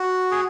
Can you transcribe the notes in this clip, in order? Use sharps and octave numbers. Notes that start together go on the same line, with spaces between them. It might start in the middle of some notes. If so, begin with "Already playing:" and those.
Already playing: F#4
G#4